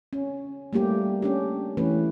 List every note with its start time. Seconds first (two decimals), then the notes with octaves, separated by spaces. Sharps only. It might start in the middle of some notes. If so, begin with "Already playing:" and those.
0.13 C#4
0.73 G3 A3 A#3 G4
1.22 C#4 D4 G4
1.77 E3 A3 C#4 B4